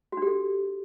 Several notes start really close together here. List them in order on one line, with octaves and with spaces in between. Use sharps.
F#4 D4 G4 A4